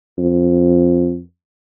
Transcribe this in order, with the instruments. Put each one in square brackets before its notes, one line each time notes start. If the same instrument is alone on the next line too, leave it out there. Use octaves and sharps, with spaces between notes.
[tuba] F2